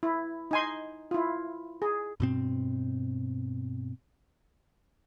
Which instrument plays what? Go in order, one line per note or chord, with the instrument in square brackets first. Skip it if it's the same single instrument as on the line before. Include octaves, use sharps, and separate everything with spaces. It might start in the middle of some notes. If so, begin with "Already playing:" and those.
[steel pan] E4
D#4 G#5 C6
E4 F4
G#4
[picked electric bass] G2 B2 C4